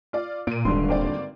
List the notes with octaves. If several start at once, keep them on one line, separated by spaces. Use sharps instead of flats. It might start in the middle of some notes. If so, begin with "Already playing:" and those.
F4 D5
A#2 D7 D#7
D#1 G#1 G2 D3 C6
A#3 C4 D5